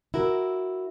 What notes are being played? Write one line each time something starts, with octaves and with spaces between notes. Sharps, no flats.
E4 F#4 A#4